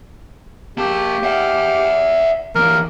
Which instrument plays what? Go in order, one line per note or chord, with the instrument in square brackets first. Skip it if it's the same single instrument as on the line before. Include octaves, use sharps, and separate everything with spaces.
[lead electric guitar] A#3 A5 [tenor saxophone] G4
[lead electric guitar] E5 F#5
[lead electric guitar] E3 A#3 [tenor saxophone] A#4